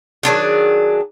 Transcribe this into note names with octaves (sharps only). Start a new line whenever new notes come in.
D#3 F#3 D4 G#4